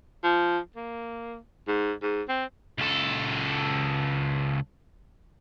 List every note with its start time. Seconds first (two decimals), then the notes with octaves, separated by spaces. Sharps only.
0.24 F3
0.76 A#3
1.67 G#2
2.02 G#2
2.29 C4
2.78 C#2 A4